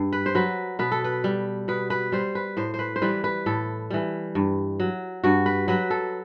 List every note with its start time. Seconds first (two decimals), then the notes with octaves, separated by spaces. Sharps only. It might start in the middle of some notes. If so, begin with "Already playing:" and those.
Already playing: G2
0.13 B4
0.26 C5
0.35 F#3 B4
0.79 B2 B4
0.91 A4
1.04 B4
1.24 G3
1.68 B2 B4
1.90 B4
2.12 G3 C5
2.35 B4
2.57 A2 C5
2.74 C5
2.79 B4
2.96 C5
3.02 E3 G3 B4
3.24 B4
3.46 A2 A4
3.90 E3 G3
4.35 G2
4.80 F#3
5.24 G2 F#4
5.46 B4
5.68 F#3 B4
5.90 A4